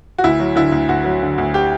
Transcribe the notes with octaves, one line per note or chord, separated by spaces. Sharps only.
F#4
D2 E4
F#3
D3 E4
D2
D2 F#4
F#3
D3
D2
G4